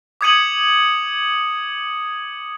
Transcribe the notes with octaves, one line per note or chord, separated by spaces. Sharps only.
D6 D#6 G#6 C#7 D#7 F#7